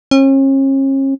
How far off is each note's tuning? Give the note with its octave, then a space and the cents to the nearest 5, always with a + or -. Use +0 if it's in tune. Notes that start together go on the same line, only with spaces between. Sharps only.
C#4 -40